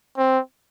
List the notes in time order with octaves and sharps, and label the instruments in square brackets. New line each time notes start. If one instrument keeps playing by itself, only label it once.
[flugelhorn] C4